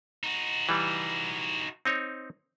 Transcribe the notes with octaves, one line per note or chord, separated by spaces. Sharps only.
D#4 F#4
E3 G3
C4 D#4 C#5